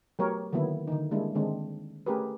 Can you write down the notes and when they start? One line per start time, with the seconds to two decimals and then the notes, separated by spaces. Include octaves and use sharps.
0.19 F#3 A3 B3 G4 A#4 C#5
0.53 D3 D#3 F#3 A#3 B3 E4
0.88 D3 D#3 D#4
1.11 G3 G#3 A#3 D4 E4
1.35 D3 D#3 G#3 C4 D4
2.06 A3 C#4 G4 G#4 A#4 B4